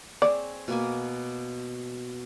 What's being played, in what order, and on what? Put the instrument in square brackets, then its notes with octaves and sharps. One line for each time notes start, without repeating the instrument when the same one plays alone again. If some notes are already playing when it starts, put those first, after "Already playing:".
[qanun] C4 G#4 C#5 [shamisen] D5
[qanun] B2 A#3 G#5